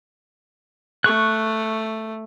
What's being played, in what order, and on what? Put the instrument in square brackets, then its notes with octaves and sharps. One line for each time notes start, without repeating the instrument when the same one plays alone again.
[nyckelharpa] A3 [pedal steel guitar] C#6 F#6